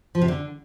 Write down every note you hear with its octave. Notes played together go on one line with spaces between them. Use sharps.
F3
C3
D3